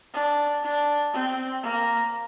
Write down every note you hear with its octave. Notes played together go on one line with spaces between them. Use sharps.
D4
D4
C4
A#3